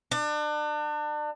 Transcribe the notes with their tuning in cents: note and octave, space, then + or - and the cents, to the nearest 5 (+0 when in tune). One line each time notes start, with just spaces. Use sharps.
D4 +35